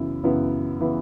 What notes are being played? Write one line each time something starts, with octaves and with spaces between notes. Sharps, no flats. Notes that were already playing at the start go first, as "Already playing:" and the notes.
Already playing: F#2 C#3 E3 B3 E4
F#2 C#3 E3 B3 E4
C#3 E3 B3 E4